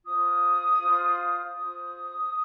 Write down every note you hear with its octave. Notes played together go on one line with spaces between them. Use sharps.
F4 C5 D#6
F4 C5
F4 C5 D#6